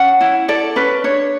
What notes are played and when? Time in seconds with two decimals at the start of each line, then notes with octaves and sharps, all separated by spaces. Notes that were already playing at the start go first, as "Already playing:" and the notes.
Already playing: C#4 F#5
0.21 E4
0.48 A4 D5
0.76 C#4 B4
1.04 D4 C#5